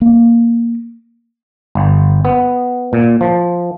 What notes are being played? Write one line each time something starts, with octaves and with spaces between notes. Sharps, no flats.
A#3
G1
B3
A#2
F3